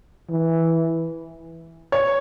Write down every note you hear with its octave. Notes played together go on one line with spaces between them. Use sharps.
E3
C#5